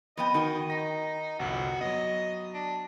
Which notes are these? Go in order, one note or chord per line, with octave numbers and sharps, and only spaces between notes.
F2 B3 D#5 G5
D#3 F#4 G5
D#4 A#6
G1 C2 F2 F#4
F#3 B3 D#5
D4